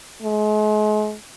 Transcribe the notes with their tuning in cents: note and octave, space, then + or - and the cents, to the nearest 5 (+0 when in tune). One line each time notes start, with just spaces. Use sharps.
G#3 +40